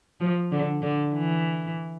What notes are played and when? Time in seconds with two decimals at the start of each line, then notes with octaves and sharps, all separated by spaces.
0.20 F3
0.52 D3
0.82 D3
1.14 E3